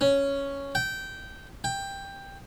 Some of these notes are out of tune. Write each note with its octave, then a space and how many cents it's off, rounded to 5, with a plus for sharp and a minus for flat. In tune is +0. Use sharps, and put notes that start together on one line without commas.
C#4 +0
G5 -15
G5 +10